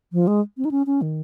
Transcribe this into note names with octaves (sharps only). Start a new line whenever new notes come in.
F3
G#3
C4
D#4
C#4
C#4
D#3